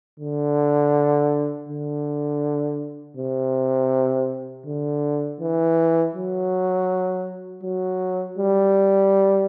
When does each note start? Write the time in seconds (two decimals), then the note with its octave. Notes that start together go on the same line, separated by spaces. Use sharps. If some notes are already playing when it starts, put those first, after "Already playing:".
0.19 D3
1.69 D3
3.17 C3
4.66 D3
5.40 E3
6.15 F#3
7.63 F#3
8.38 G3